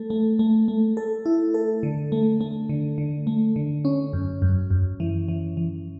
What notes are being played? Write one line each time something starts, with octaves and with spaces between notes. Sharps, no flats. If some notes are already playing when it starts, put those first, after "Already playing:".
Already playing: A3 A4
A3
A3
A3
A4
E4
A4
D3
A3
A3
D3
D3
A3
D3
C#4
F#2
F#2
F#2
E3
E3
E3